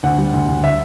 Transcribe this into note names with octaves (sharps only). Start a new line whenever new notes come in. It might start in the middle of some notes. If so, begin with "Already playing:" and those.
D2 F#5
G3
D2
D2
E5